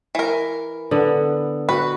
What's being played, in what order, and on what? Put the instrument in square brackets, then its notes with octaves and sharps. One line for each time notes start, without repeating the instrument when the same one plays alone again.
[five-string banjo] E3 A#4
[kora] D3 B3
[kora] F#4 [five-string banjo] B4